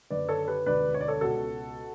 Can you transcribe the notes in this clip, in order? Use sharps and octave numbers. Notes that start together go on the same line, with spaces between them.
F#1 F#2 D3 B4 D5
A4 C#5
G4 B4
E1 D2 D3 B4 D5
C#5
D5
A4 C#5
C#2 B2 F#4 A4